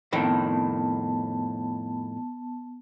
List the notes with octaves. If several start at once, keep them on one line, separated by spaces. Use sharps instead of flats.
F2 A2 D#3 B3 A5